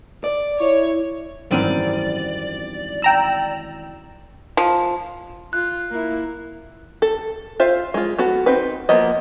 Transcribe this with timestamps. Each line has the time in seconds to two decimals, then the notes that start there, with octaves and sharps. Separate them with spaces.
0.24 D5
0.60 E4 C#5
1.51 G#1 F#2 E3 G3 C4 D5 D#7
3.02 G5 A#5 E6
4.57 F3
5.53 F4 F#6
5.90 A#3 E4
7.02 A4
7.60 F4 C5 E5 F5
7.94 G#3 F4
8.19 B3 F#4 A4
8.46 C4 D#4 B4
8.89 F3 A#3 B3 D#5